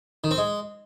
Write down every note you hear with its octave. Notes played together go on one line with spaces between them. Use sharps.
D#3
C4
G#3